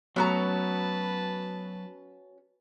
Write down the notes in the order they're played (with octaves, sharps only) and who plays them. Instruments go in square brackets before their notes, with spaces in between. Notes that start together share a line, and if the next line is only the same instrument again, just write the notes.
[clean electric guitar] F#3 [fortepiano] A3 B3 [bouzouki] C#4 F#4 A#5 [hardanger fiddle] B4 A5